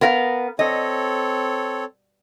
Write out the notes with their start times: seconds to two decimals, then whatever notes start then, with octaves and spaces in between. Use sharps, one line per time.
0.01 B3 A#4 F5
0.59 C4 A4 C#5 D#5